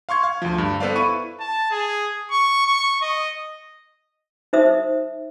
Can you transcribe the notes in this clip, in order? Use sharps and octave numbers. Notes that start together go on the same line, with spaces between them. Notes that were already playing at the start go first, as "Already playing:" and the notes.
F5 C6 C#6 G#6
F5
D2 F3
G2
B3 A4 B4 C5 D5 F5
E4 B5 C#6 D#7
A5
G#4
C#6
C#6
D#5
D#4 C5 E5 D#6